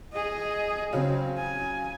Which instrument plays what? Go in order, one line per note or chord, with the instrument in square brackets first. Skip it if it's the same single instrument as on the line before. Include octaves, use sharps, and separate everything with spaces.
[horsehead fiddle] G#4 D#5
[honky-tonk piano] C#3 F#3 C#4 [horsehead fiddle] C4
[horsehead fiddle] G#5